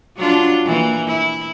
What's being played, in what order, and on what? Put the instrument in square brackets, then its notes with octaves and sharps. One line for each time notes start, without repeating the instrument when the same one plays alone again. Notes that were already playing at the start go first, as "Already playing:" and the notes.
[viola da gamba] F#3 D4 F4
E3 A#3
E4